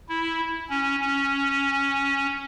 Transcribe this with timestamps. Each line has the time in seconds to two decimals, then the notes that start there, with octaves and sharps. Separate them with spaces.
0.09 E4
0.70 C#4
1.00 C#4